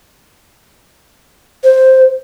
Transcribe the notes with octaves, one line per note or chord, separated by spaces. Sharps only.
C5